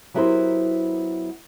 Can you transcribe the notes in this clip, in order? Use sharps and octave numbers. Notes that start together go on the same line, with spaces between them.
F#3 B3 E4 G4 A#4 C5